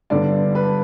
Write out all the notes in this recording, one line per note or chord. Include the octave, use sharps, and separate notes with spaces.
G2 D3 B3 D5
B4